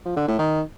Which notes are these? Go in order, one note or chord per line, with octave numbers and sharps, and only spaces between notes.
F3
D3
A2
D#3